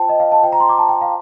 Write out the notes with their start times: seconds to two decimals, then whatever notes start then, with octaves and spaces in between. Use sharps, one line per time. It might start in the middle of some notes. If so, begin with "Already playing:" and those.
Already playing: F4 C5 G5 A5
0.09 D#5
0.20 F5
0.32 A5
0.43 F4 C5 G5
0.52 A#5
0.60 C6
0.69 D6
0.78 A5
0.89 G5
1.01 F5